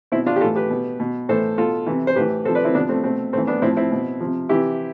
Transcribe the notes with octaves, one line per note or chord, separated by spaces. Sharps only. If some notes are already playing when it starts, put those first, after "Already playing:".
B2 C4 E4
D4 F4
G4
A2 E3 F4 A4
G4 B4
B2
B2
A2 E3 A4 C5
B2 F4 A4
C3 E3
C5
A2 E3 G4 B4
C3 F3 A4 C5
B4 D5
C4 E4
C3 F3 B3 D4
A3 C4
B2 A3 C4
A2 E3 A3 C4
B3 D4
A2 F3 C4 E4
C4 E4
B2
C3 F3
C3 E3 E4 G4